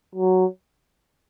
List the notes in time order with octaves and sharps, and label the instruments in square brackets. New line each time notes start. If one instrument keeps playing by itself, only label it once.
[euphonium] F#3